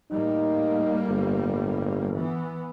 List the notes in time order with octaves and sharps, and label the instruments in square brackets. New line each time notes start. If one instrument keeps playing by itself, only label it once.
[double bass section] A2 G3 A#3 [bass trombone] D#4
[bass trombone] G1
[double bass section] E3 B3